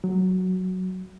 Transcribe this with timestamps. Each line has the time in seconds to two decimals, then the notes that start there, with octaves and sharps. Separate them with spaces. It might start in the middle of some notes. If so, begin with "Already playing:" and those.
0.04 F#3